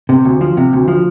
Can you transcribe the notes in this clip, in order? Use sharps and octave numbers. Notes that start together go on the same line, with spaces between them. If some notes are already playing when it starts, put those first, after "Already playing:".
C3
D2
F3
C3
D2
F3